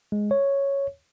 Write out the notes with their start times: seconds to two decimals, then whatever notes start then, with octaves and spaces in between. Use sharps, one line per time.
0.12 G#3
0.31 C#5